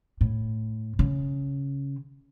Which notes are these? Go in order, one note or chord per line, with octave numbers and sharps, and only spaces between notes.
A2
C#3